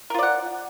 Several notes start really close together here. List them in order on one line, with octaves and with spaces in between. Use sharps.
A#4 F4 D5 F#5